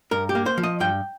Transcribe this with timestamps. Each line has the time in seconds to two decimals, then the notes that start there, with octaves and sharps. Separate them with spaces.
0.11 G2 A#4
0.29 G4
0.35 A#3
0.46 C5
0.57 F3
0.63 D#5
0.80 G2 G5